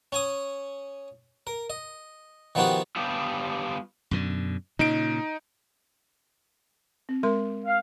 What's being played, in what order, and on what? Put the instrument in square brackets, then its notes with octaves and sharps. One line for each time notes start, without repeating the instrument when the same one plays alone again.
[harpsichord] C#4 G#5 D#6
A#4
D#5
D#3 F3 B3 D#4 F#4 G4
[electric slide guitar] G3 B3 D4 F4 G4
[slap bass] F#2 B2 D3
[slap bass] A#2 C#3 [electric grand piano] D#4 D7
[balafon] C4
G#3 A#4 C6
[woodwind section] F5